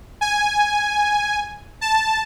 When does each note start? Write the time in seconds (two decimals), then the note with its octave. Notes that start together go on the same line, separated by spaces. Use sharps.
0.21 G#5
1.81 A5